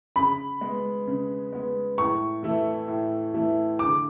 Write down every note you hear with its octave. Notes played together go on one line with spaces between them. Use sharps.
C#3 B5
G#3 B3
C#3
G#3 B3
A2 C#6
E3 A3 E4
A2
E3 A3 E4
D3 D6